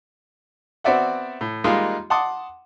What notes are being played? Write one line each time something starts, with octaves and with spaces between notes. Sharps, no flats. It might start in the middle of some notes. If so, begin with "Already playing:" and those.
B3 C4 F#4 D5 E5 F#5
A2
G3 G#3 A#3 D#4 F4
F#5 A5 C6 D6 D#6